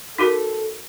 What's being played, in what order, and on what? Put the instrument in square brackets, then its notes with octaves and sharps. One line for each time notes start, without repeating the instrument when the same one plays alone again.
[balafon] D#4 F#4 A#4 [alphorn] A4